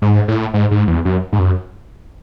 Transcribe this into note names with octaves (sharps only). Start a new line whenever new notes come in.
G#2
A2
G#2
G#2
E2
F#2
G#2
F#2